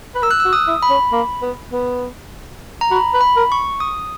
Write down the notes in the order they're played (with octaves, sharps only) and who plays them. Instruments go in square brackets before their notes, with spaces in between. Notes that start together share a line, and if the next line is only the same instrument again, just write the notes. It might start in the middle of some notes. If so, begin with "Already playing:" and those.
[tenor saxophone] B4
[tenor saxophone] A#4 [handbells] E6
[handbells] F#6
E6
[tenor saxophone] F#4
[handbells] D#6
[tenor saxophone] E4
[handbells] B5
[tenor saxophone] C#4
A#3
B3
B3
[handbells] A#5
[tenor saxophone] F#4 [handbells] B5
[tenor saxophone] B4
[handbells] B5
[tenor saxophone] A#4
[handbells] C#6
D#6